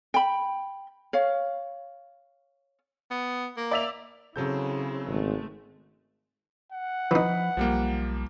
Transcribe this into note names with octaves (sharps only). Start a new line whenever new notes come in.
G5 B5
C#5 F5
B3
A#3
D5 E5 F7
C#3 F#3 C4 E4 A4 G6
G#1 G#3 A3
F#5
E3 F3 D#4 B5
B1 F3 G3 A#3